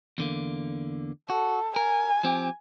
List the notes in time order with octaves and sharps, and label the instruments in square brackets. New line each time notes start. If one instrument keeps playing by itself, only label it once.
[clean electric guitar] E2 D3 A#3
[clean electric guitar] F#4 [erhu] A4
[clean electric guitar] A#4 [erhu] G#5
[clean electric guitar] F3 C4 G4